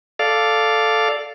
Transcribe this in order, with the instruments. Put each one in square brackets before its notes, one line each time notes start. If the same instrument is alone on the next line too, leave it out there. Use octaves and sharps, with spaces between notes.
[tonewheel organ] A4 D5 F5